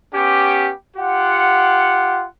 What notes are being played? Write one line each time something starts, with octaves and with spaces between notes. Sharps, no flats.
B3 C#4 G4
F4 G4 F#5